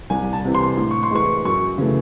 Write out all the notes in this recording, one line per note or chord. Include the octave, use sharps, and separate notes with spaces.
C2 G#5
A5
C3 E3
C6
A2
C#6
C6
E3 G#3 C#6
F#2 C#6
C#3 E3 A3